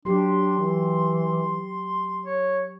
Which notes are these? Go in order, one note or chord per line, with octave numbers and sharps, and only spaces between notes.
F#3 D4 G4 C6
E3
C#5